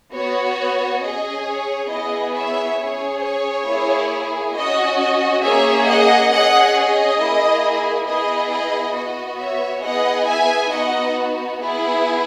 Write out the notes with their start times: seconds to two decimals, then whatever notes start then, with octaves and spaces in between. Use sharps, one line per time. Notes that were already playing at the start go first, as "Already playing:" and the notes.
0.13 B3 F#4 C#5
1.01 C#4 G#4 D#5
1.46 C#5
1.90 B3 E4 G#4 D#5
2.34 C#5 E5
2.78 C#4 G#4 C#5
3.22 C#5
3.66 A#3 E4 G#4
4.54 C#4 F#4 D#5
4.98 D#5
5.42 A#3 C#4 G#4 C#5 E5
5.86 D#5 F#5
6.30 C#4 G#4 D#5 F#5
6.75 D#5
7.19 A#3 E4 G#4
8.06 B3 E4 G#4 D#5
8.50 D#5
8.95 B3 F#4 D#5
9.38 C#5 E5
9.82 B3 E4 G#4 D#5 F#5
10.26 E5 G#5
10.70 B3 D#4 F#4 D#5 F#5
11.59 B3 E4 G#4